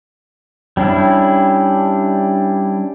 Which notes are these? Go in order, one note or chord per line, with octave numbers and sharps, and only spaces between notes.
G3 C#4 D4 E4